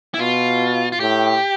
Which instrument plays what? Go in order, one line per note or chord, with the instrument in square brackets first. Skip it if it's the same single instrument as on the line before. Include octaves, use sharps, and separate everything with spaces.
[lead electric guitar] E4
[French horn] B2 [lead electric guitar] F4
[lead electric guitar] F4
[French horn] A2 [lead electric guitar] G4